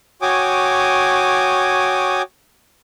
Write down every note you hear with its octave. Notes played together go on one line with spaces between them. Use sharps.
F#4 C#5 G5 G#5 D6 D#6